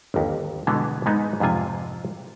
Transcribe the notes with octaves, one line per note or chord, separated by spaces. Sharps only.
G1 D#2
B2 D3 E3 G#3 B3
G#2 G#3 B3 D#4
F2 G#2 C3 F4 G#5